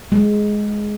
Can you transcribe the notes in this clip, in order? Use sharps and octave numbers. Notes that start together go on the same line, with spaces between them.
G#3